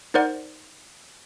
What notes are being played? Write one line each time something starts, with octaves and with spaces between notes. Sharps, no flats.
D#4 A#4 C5 D5 F#5